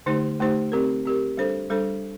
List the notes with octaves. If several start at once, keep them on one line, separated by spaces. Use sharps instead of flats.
D3 A3 D#4 G4 C5
D3 A3 D#4 G4 C5
C4 G4 A#4
C4 G4 A#4
G3 D4 A4 C5
G3 D4 A4 C5